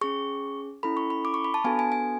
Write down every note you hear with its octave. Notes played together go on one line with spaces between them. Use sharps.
C#4 G#4 C#6
C#4 E4 A4 B5
C#6
B5
D6
C#6
B5
A5
B3 D4 F#4 A4 G#5
G#5
G#5